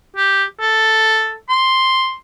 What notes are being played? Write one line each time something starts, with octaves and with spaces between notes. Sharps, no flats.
G4
A4
C6